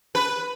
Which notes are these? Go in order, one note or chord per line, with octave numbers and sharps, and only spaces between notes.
B4